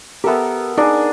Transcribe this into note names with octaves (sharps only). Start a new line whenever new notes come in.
B3 G4 A4 A#4 E5
D4 D#4 G#4 A#4